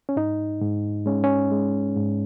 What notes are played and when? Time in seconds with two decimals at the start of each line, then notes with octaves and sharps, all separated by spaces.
0.09 C#4
0.16 G#2 D#4
0.61 G#2
1.06 G#3 C#4
1.24 C#4
1.51 G#3
1.96 G#2